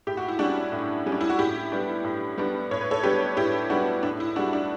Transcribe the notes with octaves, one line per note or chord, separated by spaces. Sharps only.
A2 G4
F#4
E4
G3 C#4 D4 F#4
A2
G3 C#4
D4
E4
F#4
A2 E4 G4
G3 B3 D4
A2
G3 B3 D4
A2 C#5
B4
A4 C#5
G3 B3 D4 G4 B4
A2 E4 G4
G3 B3 D4 F#4
A2 D4
E4
G3 D4 F#4
D4